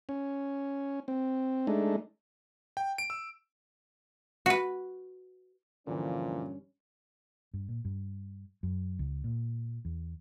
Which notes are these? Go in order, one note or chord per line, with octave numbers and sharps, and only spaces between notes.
C#4
C4
G#3 A3 D4 D#4
G5
D7
E6
F#4 B4
G2 A#2 D3 E3 F3 C#4
G2
A#2
G2
F#2
C#2
A#2
E2